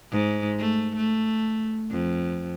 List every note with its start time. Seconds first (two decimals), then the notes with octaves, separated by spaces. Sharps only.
0.12 G#2
0.59 A3
0.96 A3
1.91 F2